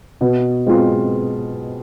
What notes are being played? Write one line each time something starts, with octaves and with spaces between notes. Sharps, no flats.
B2
G#3 C4 F4